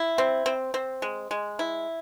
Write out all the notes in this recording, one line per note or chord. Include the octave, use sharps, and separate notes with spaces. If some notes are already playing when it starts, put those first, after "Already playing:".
Already playing: E4
C4
C4
C4
G#3
G#3
E4